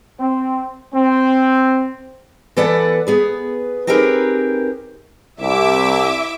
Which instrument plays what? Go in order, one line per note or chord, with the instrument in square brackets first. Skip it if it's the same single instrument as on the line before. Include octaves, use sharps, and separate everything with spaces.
[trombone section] C4
C4
[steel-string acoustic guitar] E3 B3 A4 B4 D5 F#5
B3 G#4 B4
C4 D#4 G4 G#4 A#4 B4
[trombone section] C2 [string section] E4 E5 D6